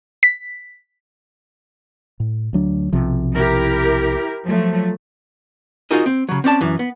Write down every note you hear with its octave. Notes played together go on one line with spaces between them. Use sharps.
B6
A2
D2 F#3 D4
B1 C3 F3
E4 G4 A#4
F3 F#3 A3
D#4 F4 F#4 G#4 A#4 D#5
C4
C#3 F#3
C4 C#4 D5 A5
F#2 E3
B3